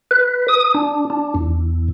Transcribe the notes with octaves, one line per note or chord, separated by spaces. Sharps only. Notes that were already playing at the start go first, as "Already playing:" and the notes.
B4
D#6
D4
D4
E2